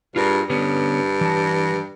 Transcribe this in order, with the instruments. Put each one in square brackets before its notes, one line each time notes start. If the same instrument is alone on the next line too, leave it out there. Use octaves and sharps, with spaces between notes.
[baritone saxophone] G2 [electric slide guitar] F4 G#4 A#4
[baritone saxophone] G2 [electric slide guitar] D3 B3 C#4
[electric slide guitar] E3 A5